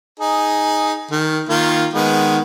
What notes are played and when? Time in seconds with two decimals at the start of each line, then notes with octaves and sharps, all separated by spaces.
0.20 D#4 G#4
1.11 D#3
1.49 D#3 A#3 F4
1.94 D#3 G#3 B3